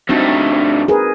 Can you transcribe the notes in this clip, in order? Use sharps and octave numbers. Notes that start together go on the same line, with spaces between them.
G2 A3 C4 D#4 F#4
G#4 A#4 B4